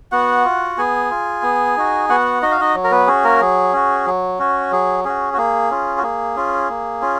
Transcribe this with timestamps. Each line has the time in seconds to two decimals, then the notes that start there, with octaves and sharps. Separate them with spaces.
0.12 B3 F#4 F#5
0.45 F4
0.78 B3 G#4 G#5
1.11 F4
1.43 B3
1.77 D#4 F#4
2.09 B3 F#4 F#5
2.42 D#4 F#4 D#5
2.51 F5
2.61 D#4 D#5
2.75 F#3
2.84 A#4
2.91 B3 B4
3.07 C#4 F#4 G#4
3.24 A#3 A#4
3.41 F#3 G#4
3.73 C#4 F#4
4.06 F#3
4.39 C#4 F#4
4.72 F#3 G#4
5.05 C#4 F#4 G#4
5.34 F#4
5.38 A#3 G#4
5.71 C#4 F4
5.98 F#4
6.03 A#3 G#4
6.36 C#4 F4
6.69 A#3
7.02 C#4 F4